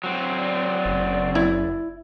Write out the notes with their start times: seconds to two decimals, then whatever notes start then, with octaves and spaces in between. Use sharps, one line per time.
0.04 F#3 C4
0.37 D5
0.86 F#1
1.35 E4